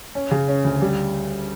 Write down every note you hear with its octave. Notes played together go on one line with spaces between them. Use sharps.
C#4
C#3
C#4
D2
G3